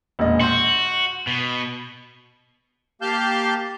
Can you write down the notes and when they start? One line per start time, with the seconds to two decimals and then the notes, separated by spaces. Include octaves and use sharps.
0.19 E1 A#2 D#5
0.41 F#4 C6 G6
1.27 B2
3.02 A#3 G4 F5 A5 F6 G6